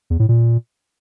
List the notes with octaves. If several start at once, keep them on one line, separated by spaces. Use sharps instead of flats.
E2
A2
A#2